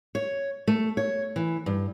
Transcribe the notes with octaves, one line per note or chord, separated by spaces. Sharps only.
C#5
A3
C#5
E3
G2